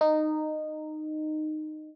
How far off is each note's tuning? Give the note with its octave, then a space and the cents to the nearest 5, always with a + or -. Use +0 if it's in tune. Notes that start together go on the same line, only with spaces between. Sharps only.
D#4 -15